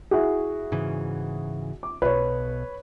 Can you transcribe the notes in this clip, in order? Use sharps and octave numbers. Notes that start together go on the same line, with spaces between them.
E4 F#4 G#4
G#2 C#3 E3
D6
B1 B2 B4 C#5